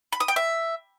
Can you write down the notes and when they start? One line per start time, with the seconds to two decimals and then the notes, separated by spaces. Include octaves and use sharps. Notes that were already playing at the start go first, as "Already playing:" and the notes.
0.13 B5
0.20 D#6
0.28 G5
0.36 E5